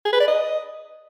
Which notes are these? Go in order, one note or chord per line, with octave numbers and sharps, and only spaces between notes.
G#4
B4
D5
D#5